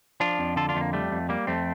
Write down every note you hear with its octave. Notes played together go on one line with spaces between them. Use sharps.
F3 D4 F4
F2
D3 F4 A4
D4 F4
F2 A3
A#3
G3 A3
F2
G3 A#3
F2 A3 C4